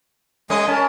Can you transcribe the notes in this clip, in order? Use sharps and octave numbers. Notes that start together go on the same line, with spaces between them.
G#3 A3 C#4 G#4 D#5 G#5
C#4 A#4 A5